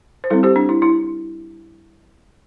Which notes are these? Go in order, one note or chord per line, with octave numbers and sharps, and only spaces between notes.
C5
G3 C4 E4 A4
G4 C5
D4
E4
E4